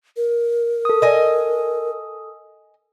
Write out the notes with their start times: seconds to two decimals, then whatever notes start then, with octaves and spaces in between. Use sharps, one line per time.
0.17 A#4
0.85 A4 D#6
1.02 D#5 G#5